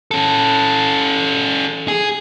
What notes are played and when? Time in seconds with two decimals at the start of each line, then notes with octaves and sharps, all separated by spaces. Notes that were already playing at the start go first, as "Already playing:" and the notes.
0.11 C#4 A4
1.88 G#4